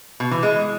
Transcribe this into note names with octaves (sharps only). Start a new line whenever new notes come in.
B2
E3
G#3